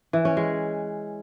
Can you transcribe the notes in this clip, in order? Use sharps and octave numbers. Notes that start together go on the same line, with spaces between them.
E3
C#4
G#3